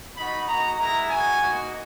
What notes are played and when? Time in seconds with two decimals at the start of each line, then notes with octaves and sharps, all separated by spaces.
0.17 B3 D#4 F#4 B5
0.48 A#3 D#4 F#4 A#5
0.79 G#3 B3 E4 A#5
1.10 G#3 B3 F#4 G#5
1.41 A#3 D#4 F#4